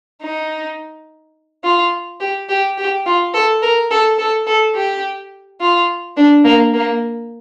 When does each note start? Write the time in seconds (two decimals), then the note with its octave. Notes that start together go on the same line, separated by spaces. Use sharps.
0.22 D#4
1.64 F4
2.20 G4
2.49 G4
2.78 G4
3.06 F4
3.34 A4
3.62 A#4
3.91 A4
4.19 A4
4.47 A4
4.75 G4
5.61 F4
6.17 D4
6.45 A#3
6.73 A#3